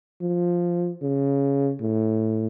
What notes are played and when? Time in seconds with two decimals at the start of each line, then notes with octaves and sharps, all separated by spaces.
0.21 F3
1.02 C#3
1.81 A2